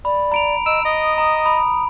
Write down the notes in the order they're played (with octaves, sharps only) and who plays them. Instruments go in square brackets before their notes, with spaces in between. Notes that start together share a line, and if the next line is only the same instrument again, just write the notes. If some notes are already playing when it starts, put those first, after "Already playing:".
[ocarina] D5 [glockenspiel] B5
[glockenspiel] A#5 D7 F7
[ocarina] D#5 [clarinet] E6 [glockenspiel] D7
[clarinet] D#5 [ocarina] D#6
[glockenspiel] A#5 [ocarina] D#6
[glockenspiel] B5